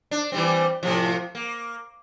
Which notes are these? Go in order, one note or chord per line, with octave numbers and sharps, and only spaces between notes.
D4
E3 G3 C4
A2 C3 F3
A#3